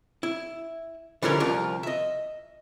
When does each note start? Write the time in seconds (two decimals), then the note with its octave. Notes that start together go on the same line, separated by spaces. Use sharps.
0.23 E4
1.22 D3 E3 F3 G3 C#4 A#4
1.40 C2 F3 F4 A#4
1.83 D#5 E5